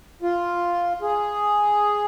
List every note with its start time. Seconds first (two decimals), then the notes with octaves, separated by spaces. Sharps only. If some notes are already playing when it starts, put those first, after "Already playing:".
0.22 F4
1.02 G#4